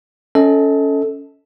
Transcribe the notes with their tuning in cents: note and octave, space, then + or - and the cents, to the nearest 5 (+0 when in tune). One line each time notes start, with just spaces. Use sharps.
C#4 +10 A4 +0 D#5 +35